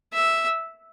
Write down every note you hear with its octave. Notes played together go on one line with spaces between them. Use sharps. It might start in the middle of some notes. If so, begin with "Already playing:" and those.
E5